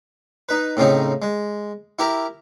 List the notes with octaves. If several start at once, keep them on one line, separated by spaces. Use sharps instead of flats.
D#4 B4
A2 C#3 C4 D#4
G#3
E4 G4 A#4